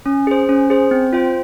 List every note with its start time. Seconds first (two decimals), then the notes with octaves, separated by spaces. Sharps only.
0.06 C#4
0.27 G#4 C5
0.49 C#4
0.70 G#4 C5
0.91 C4
1.13 F4 C5 G5